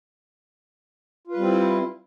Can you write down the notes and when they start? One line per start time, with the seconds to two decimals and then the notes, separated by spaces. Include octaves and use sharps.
1.27 F4
1.32 B4
1.36 G3
1.41 C4
1.45 E4